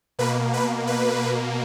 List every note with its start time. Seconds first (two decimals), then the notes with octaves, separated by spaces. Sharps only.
0.19 B2 A#3 B4
0.54 B4
0.87 B4